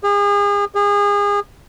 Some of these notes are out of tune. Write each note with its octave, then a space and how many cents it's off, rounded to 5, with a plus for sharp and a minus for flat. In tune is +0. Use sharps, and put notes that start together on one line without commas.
G#4 -35
G#4 -30